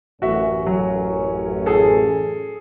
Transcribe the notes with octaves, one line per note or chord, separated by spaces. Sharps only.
A1 F#2 C#4 F#4 E5
F#3
G#4 A4